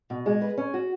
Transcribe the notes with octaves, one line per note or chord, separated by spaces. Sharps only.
B2
G#3
B4
C#4
F#4